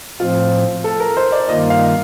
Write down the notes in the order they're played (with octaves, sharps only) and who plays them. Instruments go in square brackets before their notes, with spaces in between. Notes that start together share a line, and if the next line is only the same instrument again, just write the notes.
[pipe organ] A2 F3 C4 [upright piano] F4
[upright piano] A4
A#4
C5
D5
[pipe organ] G2 D#3 A#3 F4 [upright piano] D#5
[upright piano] F5